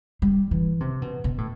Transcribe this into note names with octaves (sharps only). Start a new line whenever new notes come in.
G3
E3
C3
B2
B2
A2